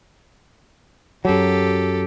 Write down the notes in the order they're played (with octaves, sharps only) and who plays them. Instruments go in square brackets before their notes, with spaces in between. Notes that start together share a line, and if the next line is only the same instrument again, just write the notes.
[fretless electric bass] F#2 F#3 [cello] G4 A4